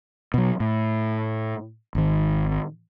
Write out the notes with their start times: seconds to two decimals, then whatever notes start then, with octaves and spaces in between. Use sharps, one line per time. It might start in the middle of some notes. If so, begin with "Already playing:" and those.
0.34 B2 F#3
0.60 A2
1.95 G#1 D#3